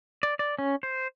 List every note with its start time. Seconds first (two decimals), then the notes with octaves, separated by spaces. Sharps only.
0.23 D5
0.39 D5
0.59 C#4
0.83 C5